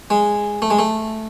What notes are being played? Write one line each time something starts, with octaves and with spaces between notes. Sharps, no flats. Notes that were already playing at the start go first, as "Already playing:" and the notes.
G#3
A3
G#3
A3